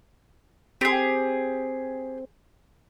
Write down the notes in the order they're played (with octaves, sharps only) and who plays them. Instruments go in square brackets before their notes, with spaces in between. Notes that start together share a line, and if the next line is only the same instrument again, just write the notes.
[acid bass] C4 [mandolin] G4 G#4